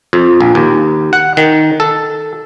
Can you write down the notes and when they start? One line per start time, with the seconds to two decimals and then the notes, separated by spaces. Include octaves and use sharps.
0.13 F2
0.41 A#1
0.55 D#2
1.13 F#5
1.37 D#3
1.80 A4